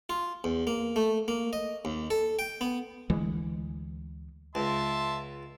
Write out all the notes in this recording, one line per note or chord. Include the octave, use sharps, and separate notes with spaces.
F4
E2
A#3
A3
A#3
D#5
D#2
A4
G5
B3
D2 E3 G#3
C#2 E5 A5 C6